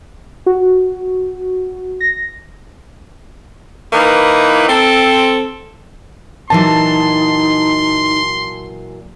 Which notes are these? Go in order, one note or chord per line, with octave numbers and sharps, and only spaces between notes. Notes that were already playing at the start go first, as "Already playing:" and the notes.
F#4
A#6
E3 A#3 D#4 E4 B4
C4 A4
A#2 E3 F#3 D#4 A5 C6